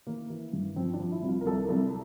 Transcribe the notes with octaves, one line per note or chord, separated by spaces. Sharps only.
E3 A#3
E3
G2
F3 C4
D4
F3
E4
C2
F4
A#4
C2 A4
C2 A4